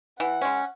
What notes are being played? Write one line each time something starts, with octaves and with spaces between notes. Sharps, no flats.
E3 F#5
G#3 C#4